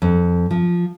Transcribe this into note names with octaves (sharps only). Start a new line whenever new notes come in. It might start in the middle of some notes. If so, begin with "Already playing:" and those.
F2
F3